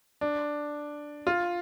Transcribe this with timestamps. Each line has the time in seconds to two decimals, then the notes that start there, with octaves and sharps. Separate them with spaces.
0.21 D4
1.27 F4